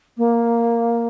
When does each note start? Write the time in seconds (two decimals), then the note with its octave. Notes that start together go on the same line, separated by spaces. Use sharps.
0.18 A#3